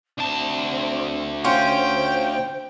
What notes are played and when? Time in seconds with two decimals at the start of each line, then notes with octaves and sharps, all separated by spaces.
0.18 D2 C4 A5
1.44 C#4 F4 C5 G5